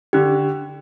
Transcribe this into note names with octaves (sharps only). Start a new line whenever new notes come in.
D3 G4